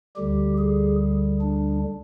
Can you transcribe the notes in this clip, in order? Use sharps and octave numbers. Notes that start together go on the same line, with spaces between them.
D2 D3 G3 G4
G#4
D4